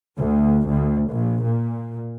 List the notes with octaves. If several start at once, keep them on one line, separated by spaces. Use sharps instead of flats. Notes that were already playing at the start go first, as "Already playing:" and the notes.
D2
D2
A#1
A#2